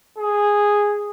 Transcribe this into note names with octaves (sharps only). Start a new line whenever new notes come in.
G#4